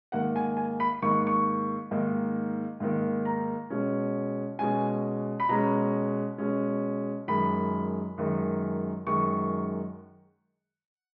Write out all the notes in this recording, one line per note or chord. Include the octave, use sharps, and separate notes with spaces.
G#2 D#3 A#3 F#5
G#5
G#5
B5
G#2 D#3 A#3 C#6
C#6
G#2 D#3 A#3
G#2 D#3 A#3
A#5
B2 G#3 C#4
B2 G#3 C#4 G#5
B5
B2 G#3 C#4 A#5
B2 G#3 C#4
F#2 D#3 G#3 B5
F#2 D#3 G#3
F#2 D#3 G#3 C#6